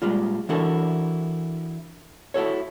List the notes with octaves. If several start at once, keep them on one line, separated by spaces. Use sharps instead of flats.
A#2 G3 G#3 F4
E3 D4 E4 F#4 A4 A#4
E4 F#4 A4 C#5